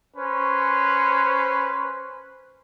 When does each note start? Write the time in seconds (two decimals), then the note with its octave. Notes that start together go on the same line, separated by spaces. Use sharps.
0.16 C#4 B4 C5